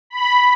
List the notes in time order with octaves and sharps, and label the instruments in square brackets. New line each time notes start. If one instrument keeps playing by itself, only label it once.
[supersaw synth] B5